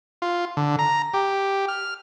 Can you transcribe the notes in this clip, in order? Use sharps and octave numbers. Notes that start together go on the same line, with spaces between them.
F4
D3
A#5
G4
F6